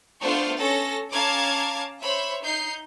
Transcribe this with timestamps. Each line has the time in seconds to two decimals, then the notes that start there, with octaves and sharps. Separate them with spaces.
0.22 A3 B3 D4 F4 C5 C#6
0.59 C#4 A4 A#6
1.13 C#4 F5 A5 A#5 D6 G#6
2.03 C5 C#5 E5 B5
2.43 D#4 G6 C7